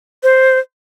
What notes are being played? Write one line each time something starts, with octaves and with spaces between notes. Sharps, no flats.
C5